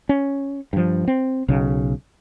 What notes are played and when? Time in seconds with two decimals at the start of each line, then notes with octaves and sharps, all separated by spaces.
0.09 C#4
0.73 G2 F3
1.08 C4
1.48 B1 C#3